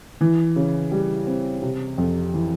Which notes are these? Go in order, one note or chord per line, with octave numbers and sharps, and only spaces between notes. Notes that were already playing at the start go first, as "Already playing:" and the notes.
E3
C#3
G3
C4
C3
F2
E3